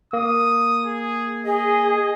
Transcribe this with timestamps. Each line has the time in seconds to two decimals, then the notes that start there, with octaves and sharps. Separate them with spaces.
0.13 A#3 D#6
0.85 G#4
1.45 G#4 D#5